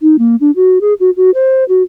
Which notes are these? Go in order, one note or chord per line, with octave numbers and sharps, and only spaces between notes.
D#4
A#3
D4
F#4
G#4
F#4
F#4
C5
F#4